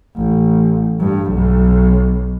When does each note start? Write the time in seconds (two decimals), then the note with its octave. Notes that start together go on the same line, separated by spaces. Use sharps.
0.15 A1
1.00 G2
1.32 B1